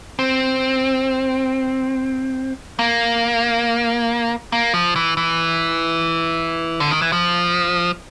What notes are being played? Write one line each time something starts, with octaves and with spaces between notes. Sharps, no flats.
C4
A#3
A#3
F3
E3
E3
D3
D#3
E3
F3